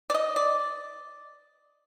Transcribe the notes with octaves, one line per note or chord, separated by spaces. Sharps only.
D5
D#5
D5